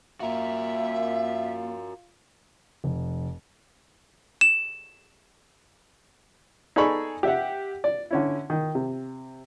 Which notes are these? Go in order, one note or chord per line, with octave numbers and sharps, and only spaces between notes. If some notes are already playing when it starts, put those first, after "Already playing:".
A#3 F4 F#4 A#4 E5
F1
E7
D#4 G#4 A4 D5 B5 C#6
G4 E5 F#5
D5
D3 C#4 E4
D#3
C3